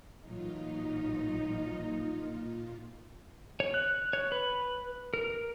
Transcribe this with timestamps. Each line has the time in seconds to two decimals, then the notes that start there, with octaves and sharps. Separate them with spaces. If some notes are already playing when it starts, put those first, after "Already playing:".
0.25 A1 A#2 E3 F#3 D#4 F4
3.60 C#5
3.74 F#6
4.13 C#5
4.32 B4
5.14 A#4